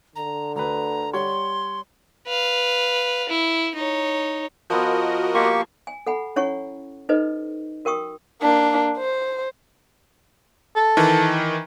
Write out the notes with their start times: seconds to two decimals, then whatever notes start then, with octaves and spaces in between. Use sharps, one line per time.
0.16 D3 A#5
0.56 D2 B4 A#5
1.13 G3 C#5 F#5 C6
2.27 B4 F5
3.29 E4
3.75 D#4 C#5
4.70 F3 B3 F#4 A#4 D#5 E6
5.35 A#3 G4 A5 C6 C#6
5.87 G#5
6.06 A4 F#5 G#5 B5
6.36 C#4 E4 C#5 F#5 G#5 C#6
7.09 D#4 F4 A4 B4 C5 D#5
7.85 F#4 A#4 G5 C#6 D#6
8.42 A#3 D4
8.97 C5
10.76 A4
10.97 D#3 E3